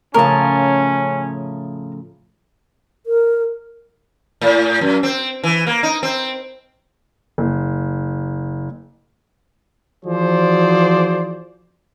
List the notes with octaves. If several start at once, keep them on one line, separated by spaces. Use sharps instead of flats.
A2 C#3 F3 C#4 A#4 A5
A#4
A2
F#2
C4
E3
A#3
D#4
C4
F#1
E3 F3 F#4 G#4 C5 D5